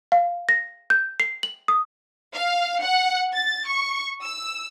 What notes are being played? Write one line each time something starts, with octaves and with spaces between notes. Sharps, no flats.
F5
A#6
G6
C7
F#7
D#6
F5
F#5
A6
C#6
E6